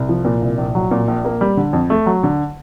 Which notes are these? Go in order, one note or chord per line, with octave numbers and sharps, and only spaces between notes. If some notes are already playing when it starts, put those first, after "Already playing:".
Already playing: C2
F3
A#2
C2
A#1
F#3
A#2
A#1
A#3
G3
D3
F2
A3
F#3
D3